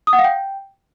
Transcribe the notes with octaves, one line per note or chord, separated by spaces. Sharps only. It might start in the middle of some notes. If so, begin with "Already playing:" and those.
D#6
F#5
F5
G5